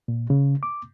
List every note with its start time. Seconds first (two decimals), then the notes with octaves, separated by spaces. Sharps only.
0.08 A#2
0.30 C#3
0.63 D6